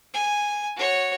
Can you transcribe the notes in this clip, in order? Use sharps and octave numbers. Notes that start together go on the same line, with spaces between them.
G#5
F#4 C#5